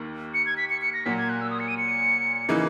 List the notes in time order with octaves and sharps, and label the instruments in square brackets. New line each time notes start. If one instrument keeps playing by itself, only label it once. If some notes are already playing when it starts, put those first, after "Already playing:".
Already playing: [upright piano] D#2 D#3 A#3
[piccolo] C#7
G#6
B6
C#7
C#7
A#6
[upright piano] A#2 F#3 A#3 [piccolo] B6
[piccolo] G#6
F#6
E6
D#6
C#7
D#7
C#7
[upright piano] C#3 E3 A#3 D#4